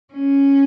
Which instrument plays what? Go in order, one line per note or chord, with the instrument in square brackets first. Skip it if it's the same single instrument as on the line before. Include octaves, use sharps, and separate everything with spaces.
[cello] C#4